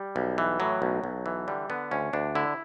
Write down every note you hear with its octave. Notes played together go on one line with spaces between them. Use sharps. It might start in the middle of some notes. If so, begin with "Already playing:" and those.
Already playing: G3
B1
E3
A2 F#3
B1
B1
E3
D3 G3
D3 B3
D2 C#4
D2 D4
D3 E4